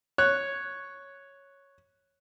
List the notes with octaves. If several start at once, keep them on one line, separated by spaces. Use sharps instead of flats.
C#5 F#6